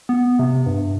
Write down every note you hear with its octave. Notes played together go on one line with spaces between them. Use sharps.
B3
C3
G2